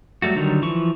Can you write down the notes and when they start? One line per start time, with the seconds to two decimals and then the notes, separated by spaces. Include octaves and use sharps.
0.22 F#3 G3 A3 F#4
0.36 D3 D#3 F#3 G3
0.62 E3 F3 C#6